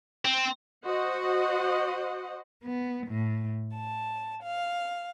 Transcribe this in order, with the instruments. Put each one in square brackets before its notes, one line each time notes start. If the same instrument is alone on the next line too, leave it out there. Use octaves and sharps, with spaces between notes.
[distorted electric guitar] C4
[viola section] F#4 C5 D#5 F#5
[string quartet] B3
A2
A5
F5